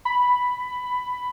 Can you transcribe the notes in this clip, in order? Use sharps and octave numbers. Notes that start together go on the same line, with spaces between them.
B5